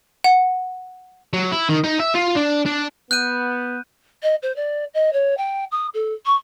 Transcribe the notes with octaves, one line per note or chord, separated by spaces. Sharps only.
F#5
F#3
E4
D#3
D#4
E5
F4
D4
D4
B3 F#6 G6 D#7
D#5
C5
D5
D#5
C#5
G5
D#6
A4
C#6